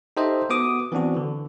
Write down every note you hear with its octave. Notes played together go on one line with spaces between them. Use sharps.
D#4 G4 A4 C5 D#5 E5
B3 F#4 D6 D#6
E3 B3 C4 D4 F#4
D3